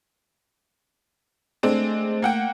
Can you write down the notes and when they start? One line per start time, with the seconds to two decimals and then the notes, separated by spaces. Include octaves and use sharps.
1.63 G#3 A3 C4 D4
2.22 A#3 F#5 G5